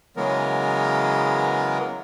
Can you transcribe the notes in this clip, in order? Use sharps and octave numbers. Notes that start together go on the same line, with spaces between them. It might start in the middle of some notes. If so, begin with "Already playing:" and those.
C#3 E3 F#3 G#3 B3 A#4